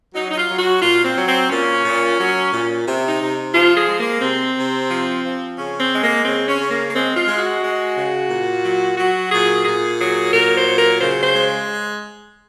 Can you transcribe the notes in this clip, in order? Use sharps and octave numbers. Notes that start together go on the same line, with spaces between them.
F#3 D#4
D#4
F4
F#3
F#4
A#2 F4
C4
F#3
C4
A#2 C#4
A#2
F#3
A#2
C3
D#4
C3
F3 F4
G#4
G#3
A#3
C3 C4
C3
F3
F3
C#3 C#4
C4
G#3
A#3
C#3 C4
C#4
C#3
A#3
A#3
G#3 C4
F4
G#3
F#4
G#3
C#3
A#2
F#3
F#3 F#4
A#2 G#4
A#2 G#4
F#3 G#4
A#2 A#4
C5
F#3
A#4
C#3 C5
C5
G#3